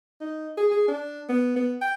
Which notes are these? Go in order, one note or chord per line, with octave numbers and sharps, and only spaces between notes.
D#4
G#4
G#4
D4
B3
B3
G5